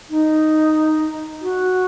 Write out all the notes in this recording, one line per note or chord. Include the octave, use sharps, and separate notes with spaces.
D#4
F#4